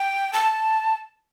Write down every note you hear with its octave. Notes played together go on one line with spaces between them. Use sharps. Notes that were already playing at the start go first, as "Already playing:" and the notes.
Already playing: G5
A5